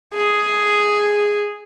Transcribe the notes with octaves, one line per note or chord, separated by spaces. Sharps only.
G#4